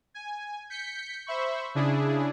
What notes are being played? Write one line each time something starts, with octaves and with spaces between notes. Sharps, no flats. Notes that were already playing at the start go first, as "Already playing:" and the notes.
G#5
G6 B6 C#7
C5 E5 B5 C#6
C#3 D4 E4 G#4